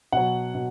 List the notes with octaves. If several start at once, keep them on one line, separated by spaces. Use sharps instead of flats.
B2 F#3 F#5
B2